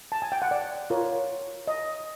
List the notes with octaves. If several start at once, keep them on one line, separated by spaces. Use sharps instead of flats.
A5
G#5
G5
F#5
D5
F4 A#4 C#5
D#5